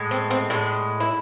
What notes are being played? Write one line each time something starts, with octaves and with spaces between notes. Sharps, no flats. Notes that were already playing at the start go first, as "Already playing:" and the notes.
Already playing: A2 G#3
C4
C4
A2 G#3 D4
E4